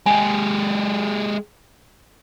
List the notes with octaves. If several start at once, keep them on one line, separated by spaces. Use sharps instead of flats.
G#3 G4 G#5